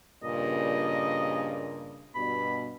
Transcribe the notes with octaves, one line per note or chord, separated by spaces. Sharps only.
G2 A#2 C#3 D#5
G2 B2 B5